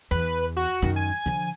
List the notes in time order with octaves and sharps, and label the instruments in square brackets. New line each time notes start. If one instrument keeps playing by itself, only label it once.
[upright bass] E2 [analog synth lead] B4
[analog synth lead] F#4
[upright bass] F#2 D#3
[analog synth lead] G#5
[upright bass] D3 F3